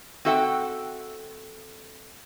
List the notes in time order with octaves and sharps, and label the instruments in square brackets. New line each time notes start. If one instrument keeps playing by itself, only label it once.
[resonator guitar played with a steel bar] C4 F#4 A4 E5 F#5 G5